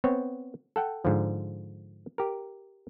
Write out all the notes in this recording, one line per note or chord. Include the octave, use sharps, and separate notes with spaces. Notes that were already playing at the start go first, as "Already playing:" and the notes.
B3 C4 C#5
A4 F#5 G5
G#2 D3 F3
G4 A#4